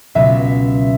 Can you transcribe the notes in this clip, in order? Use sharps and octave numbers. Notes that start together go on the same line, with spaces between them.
C#2 B2 F#3 B3 E5